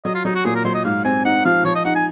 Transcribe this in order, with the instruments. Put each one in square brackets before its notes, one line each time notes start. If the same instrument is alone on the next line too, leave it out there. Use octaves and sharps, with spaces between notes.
[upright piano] F#3 [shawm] D#5
[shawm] F4
[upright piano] F#3 [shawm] D#4
[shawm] F#4
[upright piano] A#2 [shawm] G#4
[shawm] A#4
[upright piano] F#3 [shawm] C5
[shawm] D#5
[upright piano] G#2 [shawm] F5
[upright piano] C4 [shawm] G#5
[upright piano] D#4 [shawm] F#5
[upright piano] F3 [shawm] F5
[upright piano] F3 [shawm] C#5
[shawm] D#5
[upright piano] D#4 [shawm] F#5
[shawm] G#5